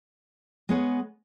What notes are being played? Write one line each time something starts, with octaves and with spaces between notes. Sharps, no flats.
G#3 B3 G#4 C#5